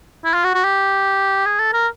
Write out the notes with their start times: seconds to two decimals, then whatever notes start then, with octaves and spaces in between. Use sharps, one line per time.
0.25 E4
0.34 F4
0.44 F#4
0.54 F#4
0.64 G4
1.46 G#4
1.59 A4
1.73 A#4